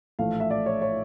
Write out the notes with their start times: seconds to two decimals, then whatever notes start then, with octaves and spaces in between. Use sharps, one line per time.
0.19 A#1 A2 E3 A3 F5
0.40 E5
0.50 D5
0.66 C#5
0.82 C#5